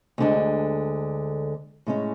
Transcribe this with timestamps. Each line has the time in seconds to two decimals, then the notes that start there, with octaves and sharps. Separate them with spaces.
0.18 D2 D3 G#3
1.87 A2 G#3 C#4